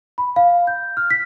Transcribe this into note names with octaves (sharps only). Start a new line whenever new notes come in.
B5
F5
G6
F6
B6